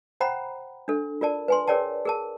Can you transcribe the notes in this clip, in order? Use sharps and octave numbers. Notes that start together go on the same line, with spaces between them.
C5 F#5 G5 A#5 B5
D4 A4
F4 A#4 D5 A5
B4 G#5 C6
G#4 A#4 C#5 D5 G5 A5
G#4 A#4 A5